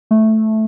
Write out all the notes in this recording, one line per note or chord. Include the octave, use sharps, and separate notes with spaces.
A3